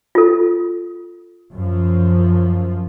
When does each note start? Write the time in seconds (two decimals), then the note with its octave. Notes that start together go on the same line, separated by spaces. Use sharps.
0.15 F4 A4
1.54 F#2 F3